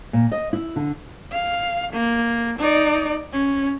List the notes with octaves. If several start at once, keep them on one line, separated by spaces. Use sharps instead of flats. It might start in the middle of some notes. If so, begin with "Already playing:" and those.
A#2
D#5
E4
D3
F5
A#3
D#4 D5
C#4